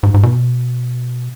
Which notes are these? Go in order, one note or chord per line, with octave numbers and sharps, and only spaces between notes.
G#2
G#2
B2